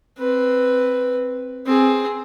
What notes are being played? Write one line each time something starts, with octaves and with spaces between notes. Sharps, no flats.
C4 B4
C4 G#4